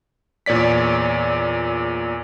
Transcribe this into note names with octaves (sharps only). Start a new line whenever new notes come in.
E2 A#2 C#5 D5 B6